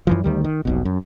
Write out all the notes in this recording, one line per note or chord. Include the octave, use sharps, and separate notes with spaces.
F#2 E3 F3
D2 D#3 G3
D#3
F1 B1 B2
F#2